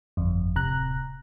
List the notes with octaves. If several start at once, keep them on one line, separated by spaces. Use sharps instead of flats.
G1 F2
D1 C3 A#5 F#6